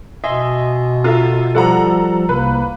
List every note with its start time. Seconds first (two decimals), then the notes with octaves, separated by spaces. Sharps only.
0.24 B2 D#5 E5 G#5 C6
1.04 F4 A4 E5 A#5
1.55 F3 G3 A4 F#5 A#5
2.29 C2 A#3 B4